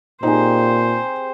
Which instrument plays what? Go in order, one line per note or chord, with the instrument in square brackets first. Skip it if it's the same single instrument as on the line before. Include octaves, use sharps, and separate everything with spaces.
[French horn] A#2 [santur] C4 G4 G#4 [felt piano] D#4 [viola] C5